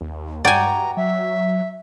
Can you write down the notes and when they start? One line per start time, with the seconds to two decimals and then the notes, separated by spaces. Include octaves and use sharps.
0.01 D#2
0.45 G2 F#4 D5 G5 G#5 A#5
0.97 F#3 E5